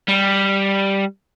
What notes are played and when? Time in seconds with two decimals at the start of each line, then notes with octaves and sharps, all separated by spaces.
0.09 G3